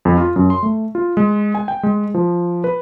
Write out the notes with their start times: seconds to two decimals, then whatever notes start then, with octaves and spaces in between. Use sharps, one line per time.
0.05 F2
0.18 F4
0.36 F#2
0.50 C6
0.63 A3
0.95 F4
1.17 G#3
1.55 G#5
1.68 G5
1.83 G#3
2.14 F3
2.64 B4